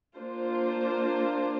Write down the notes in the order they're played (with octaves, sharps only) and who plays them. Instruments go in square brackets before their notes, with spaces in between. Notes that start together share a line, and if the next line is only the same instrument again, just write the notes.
[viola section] A#3 D4 F4 C5